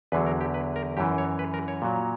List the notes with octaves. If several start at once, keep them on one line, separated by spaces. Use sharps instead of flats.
E2 D3 F#3 B4
A#4
G4
B4
A#4
F#2 E3 G4
C#5
B4
A#4
C#5
A#2 F#3